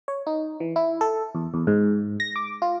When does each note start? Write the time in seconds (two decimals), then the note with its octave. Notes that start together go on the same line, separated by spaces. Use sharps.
0.08 C#5
0.27 D#4
0.60 E3
0.76 E4
1.01 A4
1.35 E2
1.54 E2
1.67 G#2
2.20 A#6
2.36 D6
2.62 F4